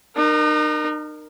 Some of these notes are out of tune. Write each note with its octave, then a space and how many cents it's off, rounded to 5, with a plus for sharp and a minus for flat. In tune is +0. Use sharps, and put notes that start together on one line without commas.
D#4 -40 A#4 +5